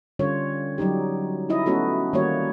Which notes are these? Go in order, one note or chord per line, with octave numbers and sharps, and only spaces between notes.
D3 G3 C#4 F4 C#5
F#3 G3 D#4 G4
D#4 E4 D#5
A3 B3 C#4 F#4 A4
D#3 G3 A#3 F#4 C#5